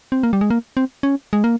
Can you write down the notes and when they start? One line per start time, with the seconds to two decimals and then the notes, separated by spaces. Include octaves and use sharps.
0.12 C4
0.23 A#3
0.33 G3
0.41 G#3
0.50 A#3
0.77 C4
1.03 C#4
1.33 G#3
1.44 A#3